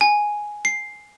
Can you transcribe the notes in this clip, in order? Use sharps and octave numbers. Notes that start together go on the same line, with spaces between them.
G#5
C7